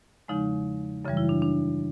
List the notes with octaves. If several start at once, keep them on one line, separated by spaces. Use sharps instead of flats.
E2 C#3 F3 G#3 D#4
F#2 C#3 E3 G3
E4
D4
D4